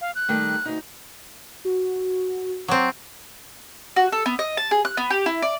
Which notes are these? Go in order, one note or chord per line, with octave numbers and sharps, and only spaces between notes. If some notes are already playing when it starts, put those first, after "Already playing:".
F5
F#6
D#3 G3 A3
D2 D#4
F#4
F#3 C4 D6
F#4
A4
B3
D#5
A5
G#4
F#6
B3
G4
E4
D5